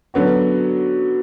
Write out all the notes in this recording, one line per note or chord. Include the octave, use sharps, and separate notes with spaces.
D3 F#3 B3 F#4